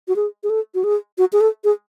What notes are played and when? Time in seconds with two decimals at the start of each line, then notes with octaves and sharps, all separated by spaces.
0.08 F#4
0.16 G#4
0.43 G#4
0.50 A4
0.75 F#4
0.84 G#4
1.18 F#4
1.33 G#4
1.41 A4
1.64 G#4